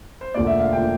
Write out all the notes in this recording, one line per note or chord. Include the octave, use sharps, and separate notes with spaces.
C5
E1 D2 D3 F3 A#3 D5
E5
F5
D3 F3 A#3 G5